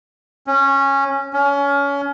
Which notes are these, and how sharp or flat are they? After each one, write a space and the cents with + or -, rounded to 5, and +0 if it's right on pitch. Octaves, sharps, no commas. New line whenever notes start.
C#4 -10
C#4 +25